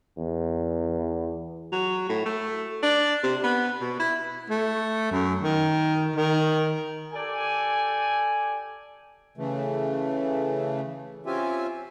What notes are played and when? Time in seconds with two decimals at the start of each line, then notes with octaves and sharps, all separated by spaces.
0.18 E2
1.72 F#3
2.09 A2
2.26 A3
2.83 D4
3.23 C3
3.43 B3
3.81 B2
4.00 E4
4.50 A3
5.11 F#2
5.40 D#3
6.15 D#3
7.13 G4 A4 D5 G#5
9.37 C#3 E3 A3
11.26 C4 C#4 F4 G4 E5 G#5